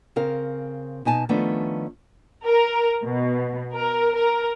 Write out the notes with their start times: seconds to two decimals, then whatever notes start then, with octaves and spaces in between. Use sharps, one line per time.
0.16 C#3 C4 A#4 F5
1.05 B2 D#4 G#5 A5
1.29 D#3 F3 A3 B3 C#4 D4
2.45 A#4
3.04 B2
3.74 A#4
4.16 A#4